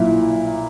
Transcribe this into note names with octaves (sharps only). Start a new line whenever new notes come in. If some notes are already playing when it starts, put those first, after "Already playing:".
Already playing: B1 A#2 A#3 E4